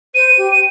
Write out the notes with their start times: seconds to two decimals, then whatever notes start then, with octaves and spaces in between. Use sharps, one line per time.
0.15 C5 D#7
0.37 G4
0.52 D#7